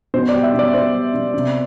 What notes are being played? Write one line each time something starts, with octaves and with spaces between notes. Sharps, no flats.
B2 C5
D5
G3
E5
B2 D5
B2 C5
G3
B2
C3